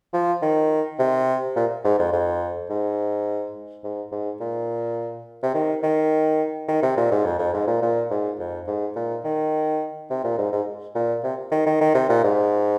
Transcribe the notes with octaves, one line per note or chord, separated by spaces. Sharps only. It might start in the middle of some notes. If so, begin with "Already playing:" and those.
F3
D#3
C3
A#2
G#2
F2
F2
G#2
G#2
G#2
A#2
C3
D#3
D#3
D#3
C3
A#2
G#2
F2
F2
G#2
A#2
A#2
G#2
F2
G#2
A#2
D#3
C3
A#2
G#2
G#2
A#2
C3
D#3
D#3
D#3
C3
A#2
G#2